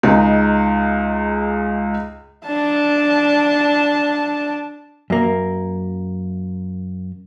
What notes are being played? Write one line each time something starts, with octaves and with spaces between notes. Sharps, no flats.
C#2 G#3 D#4
D4 A5
F#2 A#3